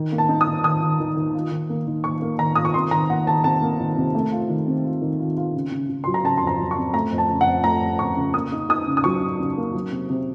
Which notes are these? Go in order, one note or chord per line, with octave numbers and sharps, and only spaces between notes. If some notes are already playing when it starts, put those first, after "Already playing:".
Already playing: D#3
A#3
A5
D#4
D#6
D#3
D#3 D#6
D#3
D#3
D#3
F4
D#3
A#3
D#3
A#3 C#6
A#3
D#3 A#5
F4 D#6
C#6
C3 C6
D#3 A#5
A#3 F#5
D#3 A5
C3 A5
A#3
D#3
C3
A3
F4
D#3
C4
F4
D#3
F4
F4
C#3
C#3
C#3
F#3 C6
A#5
C#3 A5
F2 C6
A#5
F#3
C#6
C4
A3 A#5
F2
A5
C#3
F#5
F2
A3 A#5
F2
F2 C#6
C#3
A#3 D#6
D#4
D#4 D#6
C#3
D#6
F#3 C#6
D#4
C#3
A#3
F#3
C3
C3